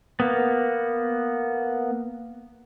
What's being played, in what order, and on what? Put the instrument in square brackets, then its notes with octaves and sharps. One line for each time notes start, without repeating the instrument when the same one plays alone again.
[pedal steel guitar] A#3 B3